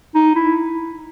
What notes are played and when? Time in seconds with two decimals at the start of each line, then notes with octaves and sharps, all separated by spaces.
0.15 D#4
0.35 E4